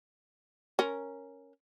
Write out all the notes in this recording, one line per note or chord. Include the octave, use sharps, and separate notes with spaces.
C#4 A#4